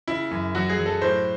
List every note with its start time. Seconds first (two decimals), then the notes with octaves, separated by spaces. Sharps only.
0.08 C#3 E4
0.31 F#2
0.55 F#3 F#4
0.70 G#4
0.78 F#3
0.86 A4
1.02 A2 C5